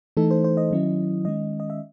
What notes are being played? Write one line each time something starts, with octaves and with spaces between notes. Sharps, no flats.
E3 A3 D#4 A4
C5
C5
D#5
D#3 F#3 C#4 E4
D#3 G#3 C#4 D#5
D#5
E5